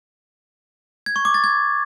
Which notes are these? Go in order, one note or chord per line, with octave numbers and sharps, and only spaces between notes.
G#6
C#6
D6
A6
G#6